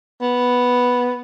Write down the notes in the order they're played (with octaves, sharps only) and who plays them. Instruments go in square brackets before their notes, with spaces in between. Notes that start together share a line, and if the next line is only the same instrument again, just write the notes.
[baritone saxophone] B3